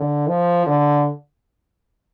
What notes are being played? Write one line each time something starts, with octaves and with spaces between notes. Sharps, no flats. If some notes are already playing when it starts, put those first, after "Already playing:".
Already playing: D3
F3
D3